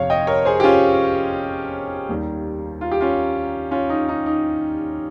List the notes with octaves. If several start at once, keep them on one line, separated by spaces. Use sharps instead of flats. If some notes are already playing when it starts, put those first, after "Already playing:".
Already playing: G1 F2 C3 F3 C#5 F5
D#5 G5
A#4 C#5
G#4 C5
G4
C#4 F4
D#2 D#3 G3
F4
G4
C#4 F4
C#4 F4
D#4
D#4
D#4